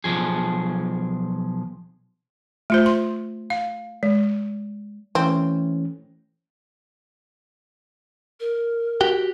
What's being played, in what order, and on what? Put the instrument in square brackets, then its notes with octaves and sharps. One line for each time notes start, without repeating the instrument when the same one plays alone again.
[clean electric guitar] B1 G2 F3 G#4
[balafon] A3 F4 C5
C6
F5
G#3
[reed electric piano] E3 A3 C#4 [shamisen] C4
[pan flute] A#4
[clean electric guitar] F#4 G4 G5